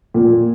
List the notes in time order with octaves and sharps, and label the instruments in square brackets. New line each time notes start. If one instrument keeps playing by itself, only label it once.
[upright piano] A#2